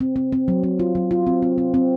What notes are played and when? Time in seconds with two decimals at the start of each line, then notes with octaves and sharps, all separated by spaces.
0.01 C4
0.16 C4
0.32 C4
0.48 F#3
0.63 C4
0.79 F4
0.95 F#3
1.11 F4
1.27 C4
1.42 C4
1.58 C4
1.74 C4